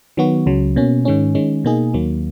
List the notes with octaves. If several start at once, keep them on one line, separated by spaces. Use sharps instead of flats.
D#3 F#3 B3 F#4
C#2 C#3 F#3
B2 A#3 C#4
G#2 D#3 G#3 C#4
D#3 G#3 C#4
B2 A#3 D#4 G#4
D#2 D#3 F#3 A#3